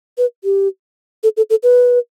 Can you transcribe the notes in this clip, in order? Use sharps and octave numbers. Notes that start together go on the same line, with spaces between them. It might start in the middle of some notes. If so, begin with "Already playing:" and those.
B4
G4
A4
A4
A4
B4